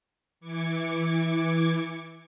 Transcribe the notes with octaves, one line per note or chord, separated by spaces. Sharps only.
E3 D6 G#6 C#7